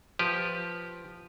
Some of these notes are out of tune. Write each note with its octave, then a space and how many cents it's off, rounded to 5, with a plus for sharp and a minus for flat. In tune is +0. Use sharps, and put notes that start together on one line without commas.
F3 +0 G4 +0 B4 +0